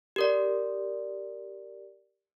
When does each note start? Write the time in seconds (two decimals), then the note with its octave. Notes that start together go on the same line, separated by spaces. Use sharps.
0.16 G4 A#4 D5